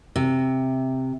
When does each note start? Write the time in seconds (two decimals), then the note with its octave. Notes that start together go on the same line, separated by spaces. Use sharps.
0.16 C3